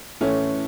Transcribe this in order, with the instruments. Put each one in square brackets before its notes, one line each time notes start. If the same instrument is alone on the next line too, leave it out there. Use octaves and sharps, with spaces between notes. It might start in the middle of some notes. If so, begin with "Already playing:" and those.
[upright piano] A2 E3 A3 C#4